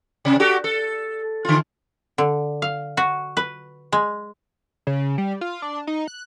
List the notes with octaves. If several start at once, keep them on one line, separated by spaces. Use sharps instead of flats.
C3
F#4 G4 A4
A4
D3 F4
D3
F5
F#4
B4
G#3
C#3
G3
F4
D4
D#4
F#6